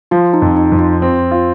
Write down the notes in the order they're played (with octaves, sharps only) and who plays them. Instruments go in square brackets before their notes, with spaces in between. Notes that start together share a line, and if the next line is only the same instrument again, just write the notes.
[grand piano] F3 [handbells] F4
[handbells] D#4
[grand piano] F2
[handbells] D#4
[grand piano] F2
[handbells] F4
[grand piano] C4
F4